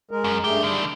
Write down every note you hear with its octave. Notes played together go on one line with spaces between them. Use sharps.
G#3 A#4
F#2
G2 A3 G4 G#4
D3 D#3 G3